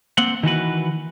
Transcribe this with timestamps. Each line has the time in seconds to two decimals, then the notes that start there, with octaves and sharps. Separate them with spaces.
0.18 A#3 C4 F#5
0.43 D#3 E3 F#4 B4